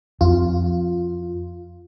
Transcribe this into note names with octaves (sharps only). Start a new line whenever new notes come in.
F2 F4